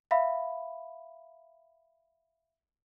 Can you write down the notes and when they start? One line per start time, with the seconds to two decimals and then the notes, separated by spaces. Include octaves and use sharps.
0.11 E5 F5 B5